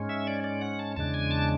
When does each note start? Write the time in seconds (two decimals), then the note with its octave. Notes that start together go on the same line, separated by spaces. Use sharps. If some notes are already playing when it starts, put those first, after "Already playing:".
Already playing: G#2 G#3 C#4
0.09 E5
0.27 D5
0.44 D5
0.61 F#5
0.79 A5
0.96 E2 C#3 G#3 D4 A5
1.14 G#5
1.31 A5